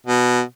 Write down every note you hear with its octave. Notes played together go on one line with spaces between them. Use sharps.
B2